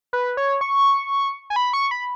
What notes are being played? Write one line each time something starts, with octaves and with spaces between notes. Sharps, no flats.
B4
C#5
C#6
G#5
B5
C#6
B5